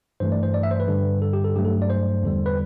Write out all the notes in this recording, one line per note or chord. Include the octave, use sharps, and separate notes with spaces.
G2 E3 A3 C5
D5
C5
D5
E5
C5
B4
G2 D3 G3
A4
G4
A4
G2 F#3 A3 G4
A4
D5
C5
E2 D3 G3
B4